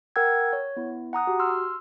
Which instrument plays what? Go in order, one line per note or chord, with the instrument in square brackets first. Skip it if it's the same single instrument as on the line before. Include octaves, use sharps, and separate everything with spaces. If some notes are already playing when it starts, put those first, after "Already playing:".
[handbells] A#4 F#5 G5 E6 G#6
C#5
B3 E4
F#5 A#5 D#6 F#6
F#4 G4
C6 E6 F6